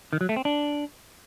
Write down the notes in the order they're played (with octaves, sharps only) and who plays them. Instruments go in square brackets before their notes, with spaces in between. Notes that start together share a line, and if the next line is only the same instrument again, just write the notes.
[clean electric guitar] D#3
F#3
A3
C4
D4